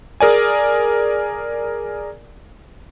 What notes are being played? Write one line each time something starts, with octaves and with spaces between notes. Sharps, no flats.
G#4 A#4 D5 G#5